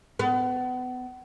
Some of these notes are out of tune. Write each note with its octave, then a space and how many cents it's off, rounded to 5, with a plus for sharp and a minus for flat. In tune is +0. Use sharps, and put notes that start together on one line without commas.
B3 +30